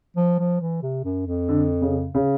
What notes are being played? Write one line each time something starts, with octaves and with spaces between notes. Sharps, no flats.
F3
F3
E3
C3
F#2
F2
D3
C#3
C#3